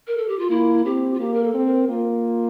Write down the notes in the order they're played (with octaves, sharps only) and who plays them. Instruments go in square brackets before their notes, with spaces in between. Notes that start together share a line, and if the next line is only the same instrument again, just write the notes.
[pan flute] A#4
A4
G4
F4
[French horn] A#3 [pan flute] E4
[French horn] C4 [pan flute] G4
[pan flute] F4
[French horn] A#3 [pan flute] G4
[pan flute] A#4
A4
[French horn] C4
[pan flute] A#4
[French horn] A#3 [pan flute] F4